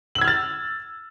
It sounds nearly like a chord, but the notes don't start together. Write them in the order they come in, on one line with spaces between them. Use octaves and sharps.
F#7 E6 G#6 F6 A6